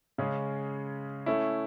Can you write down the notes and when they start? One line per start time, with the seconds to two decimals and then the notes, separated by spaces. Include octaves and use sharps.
0.18 C#3 G#3 C#4
1.26 A3 C#4 E4